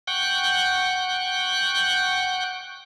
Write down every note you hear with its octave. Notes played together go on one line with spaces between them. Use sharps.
F#5 G5 C#6 F#6 G6